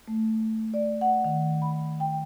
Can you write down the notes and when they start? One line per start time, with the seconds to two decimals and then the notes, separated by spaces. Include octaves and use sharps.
0.08 A3
0.74 D5
1.01 F#5
1.25 D#3
1.62 B5
2.00 G5